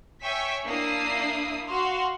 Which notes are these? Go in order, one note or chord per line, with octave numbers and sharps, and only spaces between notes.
C#5 E5 G5 G#5 C#6 B6
A#3 D4 E4 D#6 C7
F#4 F5 C6